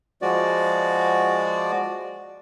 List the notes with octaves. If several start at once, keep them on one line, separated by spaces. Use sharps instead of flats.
F3 G#3 F#4 D5